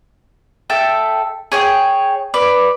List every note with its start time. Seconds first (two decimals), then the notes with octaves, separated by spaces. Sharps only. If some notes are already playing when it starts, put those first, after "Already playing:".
0.70 A4 E5 G5
1.52 G#4 C#5 G5
2.34 B4 D5